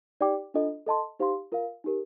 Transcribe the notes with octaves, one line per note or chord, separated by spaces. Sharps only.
D#4 G4 D5 G5 D6
D4 F4 A4 D#5
A4 D#5 A5 C6
D#4 G4 C5 F5 C6
F4 A#4 F5
D#4 G4 A#4